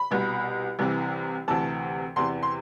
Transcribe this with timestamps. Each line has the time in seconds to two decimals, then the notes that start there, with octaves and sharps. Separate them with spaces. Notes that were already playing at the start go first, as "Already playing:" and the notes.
Already playing: B5
0.11 C2 B2
0.79 C2 C3 E3
1.48 D2 C3 E3 A5
2.16 E2 C3 E3 C6
2.43 C6